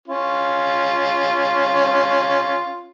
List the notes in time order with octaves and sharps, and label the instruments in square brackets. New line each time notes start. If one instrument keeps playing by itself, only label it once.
[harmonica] C#4 F4